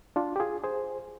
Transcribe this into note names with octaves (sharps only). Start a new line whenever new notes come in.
D4 F4
G4
F4 G#4
G#4 C5